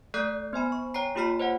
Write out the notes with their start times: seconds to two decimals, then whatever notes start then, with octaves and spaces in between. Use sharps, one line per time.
0.14 A3 A4 D5 F#6 G6 C7
0.53 B3 C5 G#5 B5
0.72 C#6
0.94 C#5 G5 G#5 A#5 C7
1.15 A#3 F4 G4 B5 F6 B6
1.40 C5 C#5 D#5 F#5